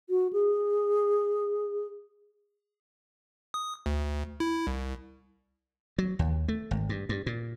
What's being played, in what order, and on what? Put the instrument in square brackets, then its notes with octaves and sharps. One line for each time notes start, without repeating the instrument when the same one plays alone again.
[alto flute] F#4
G#4
[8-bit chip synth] D#6
D2
E4
C2
[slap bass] F#3
D#2
A3
G#1
G2
G2
A#2